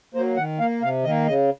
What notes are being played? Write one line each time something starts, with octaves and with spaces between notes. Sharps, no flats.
F#3 A#3 C5
D#3 F#5
A#3 F5
C3 F5
D#3 A#3 D#5
C#3 D#5